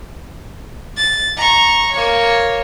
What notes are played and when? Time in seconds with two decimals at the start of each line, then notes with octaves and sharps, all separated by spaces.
0.97 A6
1.36 A#5 C#6
1.92 A#3 C#5